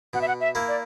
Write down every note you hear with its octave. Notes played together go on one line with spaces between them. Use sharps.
B2 F#5
E5
F#5
E5
A#3 E4
D5